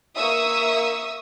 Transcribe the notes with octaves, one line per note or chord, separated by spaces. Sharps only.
A#3 E5 C#6 D#6 E6